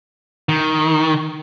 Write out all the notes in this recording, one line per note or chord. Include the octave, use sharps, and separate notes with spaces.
D#3